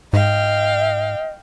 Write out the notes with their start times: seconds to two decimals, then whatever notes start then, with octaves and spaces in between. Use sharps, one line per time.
0.13 G#2 D#5 F5 G5